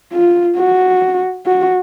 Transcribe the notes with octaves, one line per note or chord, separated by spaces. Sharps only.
F4
F#4
F#4